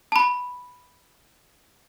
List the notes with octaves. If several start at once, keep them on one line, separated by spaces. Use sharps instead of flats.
A5 B5